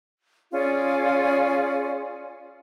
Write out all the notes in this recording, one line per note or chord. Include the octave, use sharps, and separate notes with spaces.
C#4 F4 G#4 D5